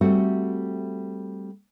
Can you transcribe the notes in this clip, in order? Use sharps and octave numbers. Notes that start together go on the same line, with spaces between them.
G3 A3 C4 F#4